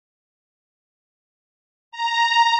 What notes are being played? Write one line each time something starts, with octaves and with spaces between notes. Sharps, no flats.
A#5